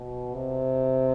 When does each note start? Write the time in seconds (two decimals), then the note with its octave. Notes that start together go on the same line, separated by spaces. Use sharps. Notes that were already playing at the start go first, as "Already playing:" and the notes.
Already playing: B2
0.34 C3